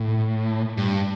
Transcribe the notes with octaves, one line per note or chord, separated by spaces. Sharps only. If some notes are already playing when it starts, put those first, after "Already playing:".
Already playing: A2
G2